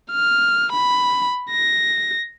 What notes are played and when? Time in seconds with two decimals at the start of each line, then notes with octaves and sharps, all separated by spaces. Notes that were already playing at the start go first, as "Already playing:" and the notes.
0.11 F6
0.72 B5
1.51 A#6